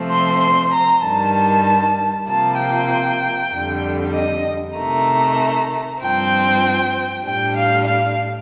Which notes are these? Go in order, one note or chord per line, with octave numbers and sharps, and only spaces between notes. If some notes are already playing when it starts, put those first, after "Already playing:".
Already playing: C3 F3 A3 C4
C6
C6
A#5
G2 D#3 G3 A5
C3 F3 A#3 A5
G5
F2 D3 G3
D#5
C3 D#3 A3 A#5
G2 F3 C4 G5
A2 G3 D4 G5
F5
F5